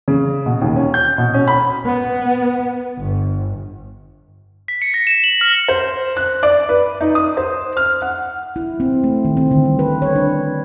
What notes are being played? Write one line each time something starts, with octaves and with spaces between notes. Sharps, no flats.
C#3
B2
D#2
C#4
G6
B2
C#4
B5
B3
G1
B6
C#7
A#6
E7
F#7
F6
C5
F#6
D5
B4
D#4
D#6
C5
F6
F#5
E4
C4
A3
D#3
C4
D3
G3
B4
C#5
D4